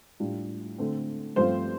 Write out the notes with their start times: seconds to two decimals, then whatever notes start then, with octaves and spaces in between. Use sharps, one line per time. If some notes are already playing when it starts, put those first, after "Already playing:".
0.20 A2 G3 D4 F4
0.78 D3 A3 C4
1.36 G2 F3 A3 C4 F4 C5